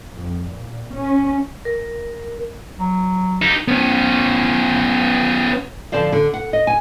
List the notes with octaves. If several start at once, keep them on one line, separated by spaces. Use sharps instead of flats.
F2
A#2
C#4
A#4
F#3
D#4 G4
B3 C#4
D3 F3 C5 D5 F5
D3
F#5
D#5
G#5